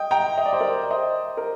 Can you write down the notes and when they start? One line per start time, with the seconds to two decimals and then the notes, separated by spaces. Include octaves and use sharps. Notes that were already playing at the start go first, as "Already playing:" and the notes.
Already playing: D#5 G5
0.11 G5 A#5
0.37 D#5
0.45 D5
0.53 C5
0.60 A#4 D5
0.90 C5 D#5
1.37 A#4